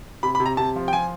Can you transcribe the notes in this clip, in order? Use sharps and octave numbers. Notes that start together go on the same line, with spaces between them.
C3 B5
B5
C3
A#5
C3 A5
F3
G5
F3 G#5